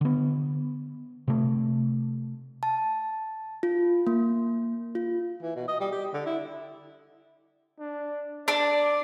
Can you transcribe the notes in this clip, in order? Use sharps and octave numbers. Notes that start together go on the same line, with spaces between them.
D3 B3
C3 A3
A5
F4
A#3
F4
E3
B2
D#5
G3
G4
D3
E4
D4
D4 D5